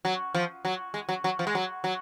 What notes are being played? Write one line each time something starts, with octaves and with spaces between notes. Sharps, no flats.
F#3
F3
F#3
G#3
F#3
F#3
F3
G#3
F#3
F#3